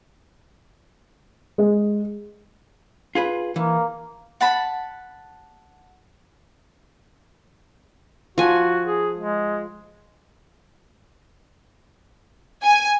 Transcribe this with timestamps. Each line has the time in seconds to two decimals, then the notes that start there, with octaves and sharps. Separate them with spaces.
1.58 G#3
3.15 F4 G#4 B4
3.56 E3 A#3
4.41 F#5 A5 B5
8.38 F3 F#4 G#5
8.85 G#4
9.17 G#3
12.63 G#5